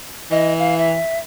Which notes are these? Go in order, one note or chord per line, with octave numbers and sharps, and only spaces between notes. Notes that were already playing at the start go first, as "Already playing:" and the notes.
E3 D#5
F5
E5